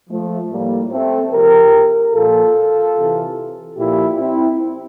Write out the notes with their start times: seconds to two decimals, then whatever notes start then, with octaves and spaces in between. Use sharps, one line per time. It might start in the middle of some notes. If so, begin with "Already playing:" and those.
0.10 F3 A3
0.51 A2 F3 G3 A#3
0.91 A3 C4
1.32 C3 F3 G4 A#4
2.14 A#2 F3 F4 A4
2.96 C3 E3
3.77 A#2 F3 E4 G4
4.18 C4 E4